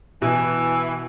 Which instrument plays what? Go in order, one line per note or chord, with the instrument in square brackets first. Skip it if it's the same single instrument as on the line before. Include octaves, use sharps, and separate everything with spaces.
[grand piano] B2 [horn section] E3